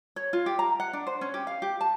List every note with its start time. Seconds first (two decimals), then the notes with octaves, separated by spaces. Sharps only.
0.16 C#5
0.33 F4
0.46 G4
0.59 A#5
0.80 F#5
0.93 D4
1.07 C5
1.21 C#4
1.34 G4
1.47 F5
1.62 G4
1.81 A5